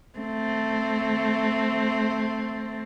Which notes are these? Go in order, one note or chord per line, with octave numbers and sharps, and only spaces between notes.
A3 C4